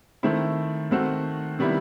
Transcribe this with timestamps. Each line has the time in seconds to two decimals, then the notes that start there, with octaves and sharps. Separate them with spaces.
0.23 D#3 A3 C4 E4
0.91 D#3 A3 C4 F#4
1.59 C3 D#3 G3 B3 E4